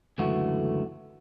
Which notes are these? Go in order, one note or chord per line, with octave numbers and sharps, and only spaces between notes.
C#2 F#2 D3 E3 A3 F#4